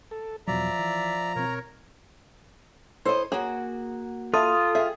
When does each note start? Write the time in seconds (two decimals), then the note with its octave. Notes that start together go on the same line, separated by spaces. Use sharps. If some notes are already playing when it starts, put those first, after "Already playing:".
0.11 A4
0.47 E2 B2 F3 F#3 D5 E5 A#5
0.79 E3
1.36 B2 C4 A#4 C#5
3.05 E4 A4 C5 C#5 D#5
3.32 A#3 F#4 G#4 C#5 G#5
4.34 F4 A4 E5 B5 D#6
4.75 G#4 E5 G5